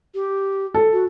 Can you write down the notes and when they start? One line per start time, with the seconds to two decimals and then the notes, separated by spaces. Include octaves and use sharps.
0.14 G4
0.74 A4
0.92 F#4